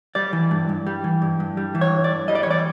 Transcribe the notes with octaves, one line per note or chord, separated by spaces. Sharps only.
G3 D5
E3
G2
G2
G3
E3
G2
G2
G3
E3
C#5
G2
D5
G2
G3 D#5
D5
C#5
E3 D5